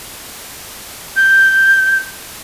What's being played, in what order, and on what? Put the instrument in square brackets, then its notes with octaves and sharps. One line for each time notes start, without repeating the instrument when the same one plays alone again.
[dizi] G6